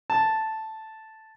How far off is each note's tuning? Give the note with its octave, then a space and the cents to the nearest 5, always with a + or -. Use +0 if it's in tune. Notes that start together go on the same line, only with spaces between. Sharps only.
A5 +0